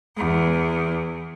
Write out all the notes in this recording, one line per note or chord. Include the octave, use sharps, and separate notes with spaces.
E2